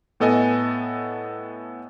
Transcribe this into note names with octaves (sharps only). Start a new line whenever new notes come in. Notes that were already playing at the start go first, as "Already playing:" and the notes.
A2 B3 A4 D#5 G#5